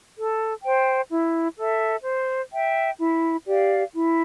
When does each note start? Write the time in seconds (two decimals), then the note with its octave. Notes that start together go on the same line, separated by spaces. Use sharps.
0.15 A4
0.62 C5 G5
1.09 E4
1.57 A4 E5
2.03 C5
2.51 E5 G5
2.98 E4
3.45 G4 D5 F5
3.92 E4